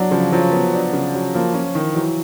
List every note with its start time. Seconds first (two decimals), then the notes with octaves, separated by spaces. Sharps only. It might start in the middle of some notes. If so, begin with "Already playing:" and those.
Already playing: F#3 D4
0.11 C#3 F3
0.33 F3 F#3
0.52 B3
0.73 D4
0.93 C#3
1.14 F#3
1.34 F3 A#3
1.54 F3 C#4
1.75 D#3 E3
1.95 E3 F#3